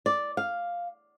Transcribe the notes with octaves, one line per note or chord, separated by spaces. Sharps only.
D5
F5